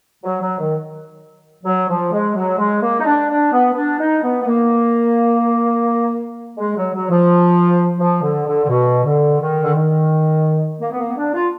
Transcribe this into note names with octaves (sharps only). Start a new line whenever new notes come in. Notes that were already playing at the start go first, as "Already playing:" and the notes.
F#3
F#3
D#3
F#3
F3
G#3
F#3
G#3
A#3
D#4
D4
D4
B3
B3
D4
D#4
B3
B3
A#3
G#3
F#3
F#3
F3
F3
D3
D3
D3
B2
D3
D#3
D3
D#3
A#3
B3
A#3
B3
D4
F4